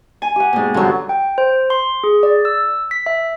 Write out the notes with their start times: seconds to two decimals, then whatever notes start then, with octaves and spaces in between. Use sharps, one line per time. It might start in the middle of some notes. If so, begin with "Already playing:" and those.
0.22 G#5
0.36 G4 F#5
0.53 G#2 B2
0.74 G2 D3 F3 F#3
1.09 G5
1.38 C5
1.70 C6
2.04 G#4
2.23 D5
2.45 E6
2.91 B6
3.06 E5